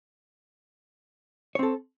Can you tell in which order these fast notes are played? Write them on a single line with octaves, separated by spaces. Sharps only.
C#5 C4 A4